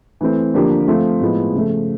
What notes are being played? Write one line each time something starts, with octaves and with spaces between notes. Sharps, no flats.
E3 A3 C4
D3 F3 A#3 D4 G4
F3 A3 C4 F4
A2 F3 G#3 B3
C#3 F3 A3